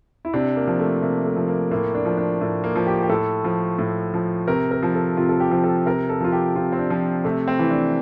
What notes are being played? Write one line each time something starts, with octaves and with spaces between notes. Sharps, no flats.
E4
C3 D4
A#3
F3
A3
C3 A#3
A3
F3
A#3
A2 A#3
D4
F3
D4
A2
A#3
F3
G4
G4
A2 A4
F3
A2
F3
C3 A#4
A#4
F3
A4
C3 F4
A4
G4
F3
A4
C3 A#4
A4
F3 F4
G4
C3 F4
C4
D4
F3
C3 A3
C4
E3
D4